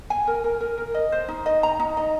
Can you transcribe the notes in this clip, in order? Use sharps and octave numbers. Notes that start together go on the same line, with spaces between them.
G#5
A#4
A#4
A#4
A#4
D#5
C5
D#4
D#5
A#5
D#4
D#5